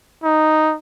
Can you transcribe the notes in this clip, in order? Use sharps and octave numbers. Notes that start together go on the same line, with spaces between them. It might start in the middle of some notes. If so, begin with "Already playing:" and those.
D#4